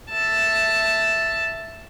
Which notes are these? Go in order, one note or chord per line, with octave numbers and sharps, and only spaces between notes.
E5 A5